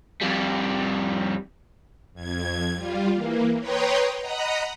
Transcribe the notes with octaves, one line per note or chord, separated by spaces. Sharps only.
F2 G3
F2 G#6
G3 F4
E3 A#3
B4 C#5 G5 A#5 C6 D#6
D#5 F#5 A#5 B5 D#6